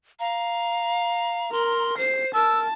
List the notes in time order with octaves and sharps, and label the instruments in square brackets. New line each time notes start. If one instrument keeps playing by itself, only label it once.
[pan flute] F5 [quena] A#5
[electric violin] A#4 [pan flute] C6
[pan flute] C5 [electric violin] C7
[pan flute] A#4 [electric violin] A5 [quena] E6